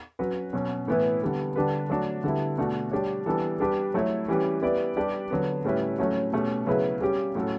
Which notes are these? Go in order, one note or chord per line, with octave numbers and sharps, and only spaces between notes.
F#3 C#4 F#4 B4
B2 F#3 C#4
A2 E3 B3 E4 B4
D3 G3 B3
D3 G3 D4 G4 B4
F#3 A3 D4 F#4
D3 G3 B3 E4
B2 A3 D4 F#4
G3 D4 G4 C#5
E3 G3 B3 D4 A4
G3 D4 G4 B4
F#3 A3 E4 A4 C#5
E3 G3 C#4 G4 B4
G3 B3 E4 B4 D5
G3 D4 G4 B4 D5
D3 F#3 B3
A2 G3 C#4 E4 B4
A2 F#3 A3 C#4 F#4
B2 A3 C#4 G4
C#3 F#3 B3 E4 B4
G3 C#4 G4
A2 F#3 C#4 F#4 A4